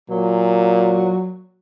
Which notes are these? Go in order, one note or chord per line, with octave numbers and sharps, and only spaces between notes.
A#2 F#3